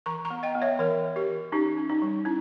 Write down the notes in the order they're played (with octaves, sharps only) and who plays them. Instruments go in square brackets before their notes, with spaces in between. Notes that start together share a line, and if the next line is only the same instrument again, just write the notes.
[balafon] E3 A#5 C#6
A#5 C#6
B3
D#5 G5
B3
C#5 E5
E3 A#4 C#5
E3
G4 A#4
E3
C#4 D#4 G4
C#4
D#4
G3
C#4 E4